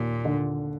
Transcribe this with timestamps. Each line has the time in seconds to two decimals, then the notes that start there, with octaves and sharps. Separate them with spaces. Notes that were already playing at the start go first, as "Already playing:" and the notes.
Already playing: D#2 A#2
0.25 D3